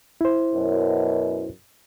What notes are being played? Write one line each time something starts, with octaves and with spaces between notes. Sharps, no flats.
E4 C5
F#2 B2